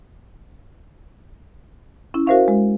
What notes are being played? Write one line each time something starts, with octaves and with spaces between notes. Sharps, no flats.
C#4 E4
F#4 A#4 C5 E5 F5 C#6
G#3